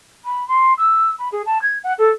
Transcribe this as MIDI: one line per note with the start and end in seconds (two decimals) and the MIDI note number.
0.24 0.46 83
0.48 0.73 84
0.78 1.14 88
1.18 1.28 83
1.32 1.42 68
1.46 1.61 81
1.62 1.78 92
1.83 1.93 78
1.98 2.09 69